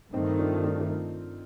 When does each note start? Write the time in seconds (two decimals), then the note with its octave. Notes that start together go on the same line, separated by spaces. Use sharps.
0.13 G2 D#3 A3 C4 D#4
0.39 D4 F4
0.64 D4 F4
0.81 D4 F4